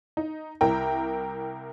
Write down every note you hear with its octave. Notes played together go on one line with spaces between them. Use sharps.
D#4
C2 E4 A#4 G5